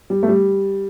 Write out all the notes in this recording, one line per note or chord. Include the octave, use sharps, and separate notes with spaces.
G3
A3
G3